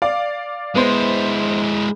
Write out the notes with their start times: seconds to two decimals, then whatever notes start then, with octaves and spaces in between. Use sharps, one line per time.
0.02 D5 F5
0.76 G#3 B3 E4 C5